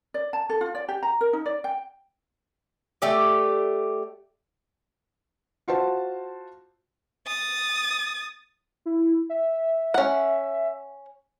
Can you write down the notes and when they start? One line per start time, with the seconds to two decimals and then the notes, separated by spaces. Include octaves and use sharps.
0.14 D5
0.33 A5
0.50 A4
0.61 F4
0.75 D5
0.88 G4
1.03 A#5
1.21 A#4
1.33 D#4
1.46 D5
1.64 G5
3.02 A3 G4 D5
5.68 F4 F#4 C5 A5
7.27 D#6 A6
8.86 E4
9.30 E5
9.94 C#4 F#5